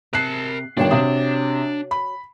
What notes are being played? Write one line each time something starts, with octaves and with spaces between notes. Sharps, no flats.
C3 A#4 A5 F#6 C7
G1 D#3 D4 F#4 C#5 G5
C3 D#6
B5